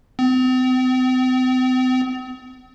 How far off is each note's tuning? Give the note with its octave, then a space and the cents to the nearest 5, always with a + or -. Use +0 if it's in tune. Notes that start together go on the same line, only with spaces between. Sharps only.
C4 -40